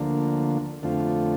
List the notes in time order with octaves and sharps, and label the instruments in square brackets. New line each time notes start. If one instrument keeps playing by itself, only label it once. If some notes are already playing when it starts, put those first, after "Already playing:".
Already playing: [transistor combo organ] D2 D3 F3 A#3
F2 D3 A3 C4 F4